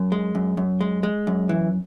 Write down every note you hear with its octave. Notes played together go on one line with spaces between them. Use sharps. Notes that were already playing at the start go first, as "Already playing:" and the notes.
Already playing: F#2
G#3
F#2
F#2
G#3
G#3
F#2
E3